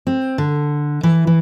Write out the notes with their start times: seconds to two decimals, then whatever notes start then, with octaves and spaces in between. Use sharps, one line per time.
0.07 C4
0.38 D3
1.03 E3
1.27 E3